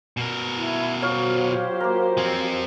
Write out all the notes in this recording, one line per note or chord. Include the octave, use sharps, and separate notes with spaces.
B2 A#4
E4
F#3 F4 G4 C5 C#5 F5
A#3 A#4
F3 C4 G#5